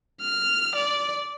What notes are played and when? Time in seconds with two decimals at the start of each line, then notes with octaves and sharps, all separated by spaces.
0.21 F6
0.76 D5